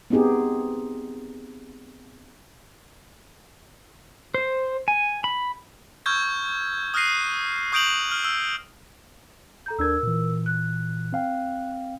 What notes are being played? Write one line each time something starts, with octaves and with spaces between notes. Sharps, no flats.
B3 C4 D#4 G4 G#4
C5
G#5
B5
C#6 E6 F6 G6 G#6
D#6 F6 F#6 A#6 C7 D#7
C#6 D#6 G6 D7 F7 F#7
F6
E6
A4 A#5 G6
D#2 D4 A#4 E6 G#6
A#2 E3
F#6
C4 F5 G5